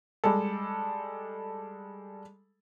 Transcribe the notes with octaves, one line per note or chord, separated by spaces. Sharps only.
G3 G#3 A4